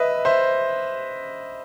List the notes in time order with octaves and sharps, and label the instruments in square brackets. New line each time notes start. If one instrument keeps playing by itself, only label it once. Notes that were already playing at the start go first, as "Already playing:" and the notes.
Already playing: [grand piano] B4 D#5 E5
C5 E5